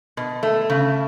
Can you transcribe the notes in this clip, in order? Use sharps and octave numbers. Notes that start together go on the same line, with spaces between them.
B2
A3
C#3